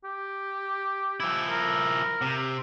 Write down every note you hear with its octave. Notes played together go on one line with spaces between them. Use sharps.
G4
F3 E4
A#4
C3